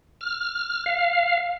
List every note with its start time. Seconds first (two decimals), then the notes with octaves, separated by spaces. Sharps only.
0.21 F6
0.86 F5